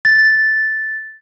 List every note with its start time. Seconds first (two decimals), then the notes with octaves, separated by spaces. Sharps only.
0.05 A6